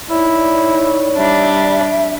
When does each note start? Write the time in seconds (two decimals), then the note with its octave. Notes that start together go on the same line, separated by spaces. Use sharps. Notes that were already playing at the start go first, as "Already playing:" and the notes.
0.10 D#4 E4 C#5 D5
1.17 G3 D4 E5